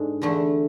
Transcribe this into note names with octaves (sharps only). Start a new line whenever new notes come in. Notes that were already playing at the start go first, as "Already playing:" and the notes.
Already playing: G#2 G#3 D4 A4
E2 D3 A3